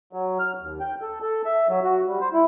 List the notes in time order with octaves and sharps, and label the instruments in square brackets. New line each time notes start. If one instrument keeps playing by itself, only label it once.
[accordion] F#3
F6
D#2
G5
A4
A4
E5
F#3
F#4
G3
C5
E4